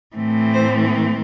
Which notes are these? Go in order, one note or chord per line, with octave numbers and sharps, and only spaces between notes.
A2 E3 A3 C4
C5